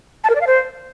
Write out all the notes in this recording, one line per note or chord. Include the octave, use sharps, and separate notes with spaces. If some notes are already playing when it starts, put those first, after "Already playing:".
A5
A#4
D5
F5
C5